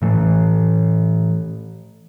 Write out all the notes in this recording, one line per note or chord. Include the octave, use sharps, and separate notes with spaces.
A2 E3 A3